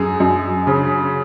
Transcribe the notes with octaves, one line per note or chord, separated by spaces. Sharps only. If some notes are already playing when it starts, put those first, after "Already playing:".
Already playing: F#2 G#4
F#2
C#3